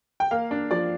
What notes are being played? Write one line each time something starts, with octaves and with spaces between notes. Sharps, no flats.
G5
A#3 F5
D4
F3 D5